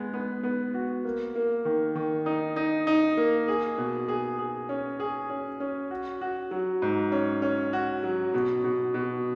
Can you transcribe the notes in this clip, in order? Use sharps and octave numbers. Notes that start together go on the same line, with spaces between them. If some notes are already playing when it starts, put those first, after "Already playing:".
Already playing: G#3 B3
B3
B3
F#4
A#3
A#3
D#3
D#3
D#4
D#4
D#4
A#3
G#4
B2
G#4
G#4
C#4
G#4
C#4
C#4
F#4
F#4
F#3
G#2
C#4
C#4
F#4
F#3
B2
B2
B2